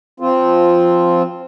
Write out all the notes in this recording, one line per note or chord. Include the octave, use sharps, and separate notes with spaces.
F3 C4 F4